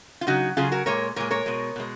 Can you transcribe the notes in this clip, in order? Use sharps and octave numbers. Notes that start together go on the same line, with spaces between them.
F4
C#3 F#3 D#4 F#4
C#3 F#3 F4 G#4
F#4 A#4
A#2 G#3 A#4 C#5
A#2 G#3 A#4 C#5
A#4 C#5
B2 G#3
B2 G#3